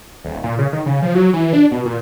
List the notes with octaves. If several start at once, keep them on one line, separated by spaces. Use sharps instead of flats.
D#1
A#2
C#3
D#3
C#3
F3
F#3
E3
D4
B2
A#2